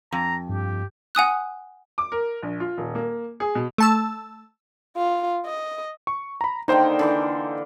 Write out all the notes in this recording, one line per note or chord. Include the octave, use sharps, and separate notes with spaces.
F2 A#5
G2 G4
F#5 G#5 D#6 F#6
D6
A#4
A#1
F4
D#1
A#3
G#4
B2
A3 A5 E6
F4
D#5
C#6
A#5 B5
D3 D#3 A#3 D#4 C5 G5
D3 E3 D6